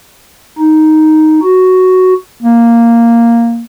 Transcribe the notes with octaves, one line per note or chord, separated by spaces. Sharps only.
D#4
F#4
A#3